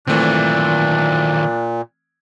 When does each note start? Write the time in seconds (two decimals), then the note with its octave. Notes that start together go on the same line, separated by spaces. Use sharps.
0.07 A#2 D#3 E3 F#3 A3 C4 D4